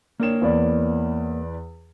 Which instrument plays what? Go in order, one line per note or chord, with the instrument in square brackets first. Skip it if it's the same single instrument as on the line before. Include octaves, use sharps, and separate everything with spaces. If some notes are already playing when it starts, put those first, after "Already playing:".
[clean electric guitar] A#3 A#4 C#5 [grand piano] D4 E7
[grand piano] E2 B4 D5